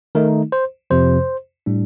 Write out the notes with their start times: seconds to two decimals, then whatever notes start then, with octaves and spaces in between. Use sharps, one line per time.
0.15 D#3 A3 D#4 A#4
0.52 C5
0.90 F2 C3 F3 C5
1.66 A2 G3 D4